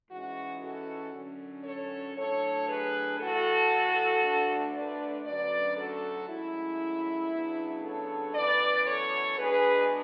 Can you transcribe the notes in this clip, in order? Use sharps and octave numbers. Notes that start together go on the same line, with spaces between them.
G#2 E3 G#3 C#4 F#4
F#4 A4
F#2 D3 F#3 C#4
A4 C#5
A2 F#3 A3 D4 A4 C#5
G#4 B4
A2 E3 A3 F#4 A4
D2 D3 A3 D4
B4 D5
D2 D3 F#3 C#4 B4 D5
F#4 A4
G#2 F#3 A3 C#4 E4
E2 C#3 F#3 B3 D4
A4 C#5
F#2 E3 B3 B4 D5
A4 C#5
B2 G#3 D4 G#4 B4